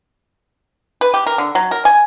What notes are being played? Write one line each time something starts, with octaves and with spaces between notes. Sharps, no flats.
B4
G4
A#4
D3
F#3
A#4
G#5